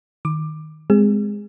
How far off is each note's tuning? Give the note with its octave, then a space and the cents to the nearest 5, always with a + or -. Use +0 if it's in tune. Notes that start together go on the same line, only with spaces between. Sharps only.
D#3 +0 D6 +15
G#3 -5 C4 -15 G#4 -25